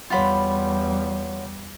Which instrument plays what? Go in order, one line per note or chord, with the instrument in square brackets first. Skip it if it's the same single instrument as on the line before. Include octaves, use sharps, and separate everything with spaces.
[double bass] E2 G3 [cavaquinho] F4 B5 [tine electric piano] C#5 F#5 C6